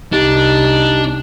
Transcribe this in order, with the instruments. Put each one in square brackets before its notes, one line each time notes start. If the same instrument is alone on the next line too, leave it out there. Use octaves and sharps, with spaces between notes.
[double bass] C2 [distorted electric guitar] D4 [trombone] D#4 [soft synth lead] G4